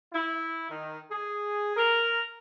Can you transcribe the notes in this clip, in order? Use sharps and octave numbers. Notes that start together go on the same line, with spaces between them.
E4
D#3
G#4
A#4